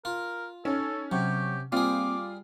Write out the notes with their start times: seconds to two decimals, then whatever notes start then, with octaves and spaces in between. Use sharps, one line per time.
0.05 F4 A#4
0.65 C#4 D#4 A4
1.12 C3 F#3 G4 F#5 C#6
1.72 G3 A#3 C4 F4 G#4 D6